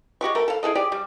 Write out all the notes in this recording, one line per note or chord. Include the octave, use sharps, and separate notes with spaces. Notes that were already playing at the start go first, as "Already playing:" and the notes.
G#3 F#4 G4 C#6
A3 A#4
A4 F5
E4 G#4 A4 D#5
G4 G#4 D5
G3